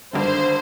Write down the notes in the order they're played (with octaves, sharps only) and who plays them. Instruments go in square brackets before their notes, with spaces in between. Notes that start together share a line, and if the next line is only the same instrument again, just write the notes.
[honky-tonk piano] G#1 G2 D3 [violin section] C5